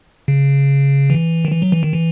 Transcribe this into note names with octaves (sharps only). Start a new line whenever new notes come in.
C#3
E3
D#3
E3
F#3
E3
D#3
E3